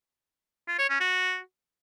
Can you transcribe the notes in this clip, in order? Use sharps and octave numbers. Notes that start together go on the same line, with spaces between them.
F4
C#5
C#4
F#4